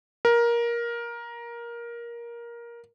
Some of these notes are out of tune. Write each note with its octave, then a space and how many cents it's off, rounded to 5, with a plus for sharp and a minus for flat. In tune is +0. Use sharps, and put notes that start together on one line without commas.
A#4 +15